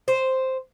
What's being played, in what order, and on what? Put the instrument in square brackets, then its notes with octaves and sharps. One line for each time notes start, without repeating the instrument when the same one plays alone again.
[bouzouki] C5